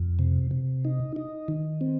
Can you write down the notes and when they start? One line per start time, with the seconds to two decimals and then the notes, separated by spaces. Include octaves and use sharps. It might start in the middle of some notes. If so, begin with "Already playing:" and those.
Already playing: F2
0.19 C3
0.51 C3
0.85 D#4
1.16 D#4
1.48 D#3
1.81 C4